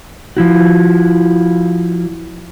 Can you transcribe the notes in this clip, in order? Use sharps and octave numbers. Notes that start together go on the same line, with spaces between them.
F3 E4 F#4